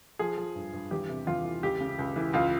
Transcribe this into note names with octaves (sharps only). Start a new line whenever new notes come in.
F3 G#4
F3
G2
G2
E2 G4
C3
E2 F4
E3
C#2 G4
C#3
C#2
E3
C#2 F4